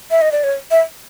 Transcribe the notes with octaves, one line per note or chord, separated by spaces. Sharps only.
E5
D#5
D5
C#5
E5